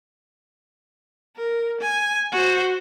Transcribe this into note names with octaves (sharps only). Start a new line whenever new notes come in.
A#4
G#5
F#4 C5